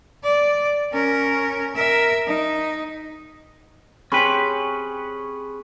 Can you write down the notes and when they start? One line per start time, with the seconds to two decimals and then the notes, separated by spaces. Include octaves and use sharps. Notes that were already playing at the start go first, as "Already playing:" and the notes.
0.24 D5
0.93 C#4 A#4
1.75 A#4 E5
2.27 D#4
4.12 C4 C#4 G4 G#4 B4 C5 B5 C#6